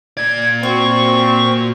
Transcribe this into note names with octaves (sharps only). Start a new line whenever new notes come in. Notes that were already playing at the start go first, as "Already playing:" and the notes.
A#2 D5 G#6
C4 F#4 C#6